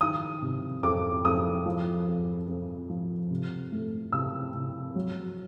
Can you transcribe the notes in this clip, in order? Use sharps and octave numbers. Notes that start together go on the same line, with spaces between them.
D#3 D#6
C3
F2 D6
F2 D#6
F3
F2
F2
F3
C3
A3
C3 E6
C3
F#3